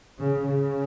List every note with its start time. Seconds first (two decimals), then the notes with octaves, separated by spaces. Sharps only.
0.19 C#3
0.47 C#3